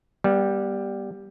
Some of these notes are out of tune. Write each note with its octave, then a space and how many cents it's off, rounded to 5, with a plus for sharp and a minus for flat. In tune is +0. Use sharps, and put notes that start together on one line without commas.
G3 +0 B3 -30